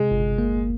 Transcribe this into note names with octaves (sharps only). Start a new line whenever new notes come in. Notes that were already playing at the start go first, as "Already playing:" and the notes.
Already playing: C3 G#3
G1
A#3